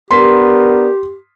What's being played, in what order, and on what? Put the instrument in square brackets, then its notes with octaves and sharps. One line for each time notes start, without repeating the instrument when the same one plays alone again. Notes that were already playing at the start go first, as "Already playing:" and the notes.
[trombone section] B3 D4 A#4 [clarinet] G4 [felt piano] C6 B6